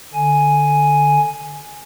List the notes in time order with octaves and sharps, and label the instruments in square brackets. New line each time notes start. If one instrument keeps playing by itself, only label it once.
[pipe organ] D3 G#5